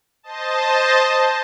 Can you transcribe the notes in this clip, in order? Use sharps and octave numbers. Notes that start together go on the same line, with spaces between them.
C5 D#5 A5